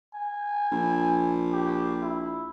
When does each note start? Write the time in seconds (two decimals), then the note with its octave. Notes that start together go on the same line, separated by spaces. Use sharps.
0.14 G#5
0.72 A#1
1.52 G4
2.02 E4